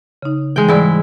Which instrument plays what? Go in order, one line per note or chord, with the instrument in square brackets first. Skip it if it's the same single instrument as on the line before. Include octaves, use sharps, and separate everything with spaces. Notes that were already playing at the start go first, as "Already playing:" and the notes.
[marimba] C#3 D#4
[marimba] E3 [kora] G#3 G5
[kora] G#2 E4 [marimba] E3 G3 D5